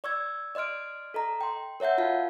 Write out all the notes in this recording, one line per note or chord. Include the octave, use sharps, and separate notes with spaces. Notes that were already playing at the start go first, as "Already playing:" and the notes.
D5 C#6 E6 G#6
D5 D#5 C6 F6 D7
A4 D#5 A#5
G5 C6
A#4 C#5 E5 F#5 G6
F4 F#4 F5 A5